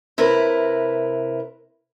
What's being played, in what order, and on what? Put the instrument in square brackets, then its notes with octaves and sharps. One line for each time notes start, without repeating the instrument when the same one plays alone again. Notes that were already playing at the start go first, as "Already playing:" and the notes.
[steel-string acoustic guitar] C3 E4 A#4 B4